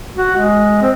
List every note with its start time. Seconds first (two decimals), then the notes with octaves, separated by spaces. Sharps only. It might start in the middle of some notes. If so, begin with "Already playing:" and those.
0.16 F#4
0.36 G#3
0.82 C4